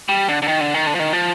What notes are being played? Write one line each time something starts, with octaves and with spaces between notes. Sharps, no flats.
G3
D3
D3
D#3
D3
D#3
D3
F3
D#3
F3